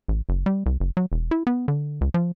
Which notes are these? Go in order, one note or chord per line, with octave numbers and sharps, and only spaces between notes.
A1
F#1
G3
C2
F#1
F#3
E1
E4
B3
D3
C#2
F3